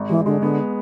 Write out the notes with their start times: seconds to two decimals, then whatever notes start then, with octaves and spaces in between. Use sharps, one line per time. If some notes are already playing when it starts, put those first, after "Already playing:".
Already playing: G#1
0.09 E3 G#3
0.26 D3 G#3
0.42 D3 B3